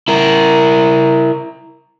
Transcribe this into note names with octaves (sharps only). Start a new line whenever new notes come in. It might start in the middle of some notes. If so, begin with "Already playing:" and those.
E4 A#4